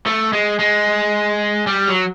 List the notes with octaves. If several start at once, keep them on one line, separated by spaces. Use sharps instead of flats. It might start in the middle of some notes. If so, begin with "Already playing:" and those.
A3
G#3
G#3
G3
F#3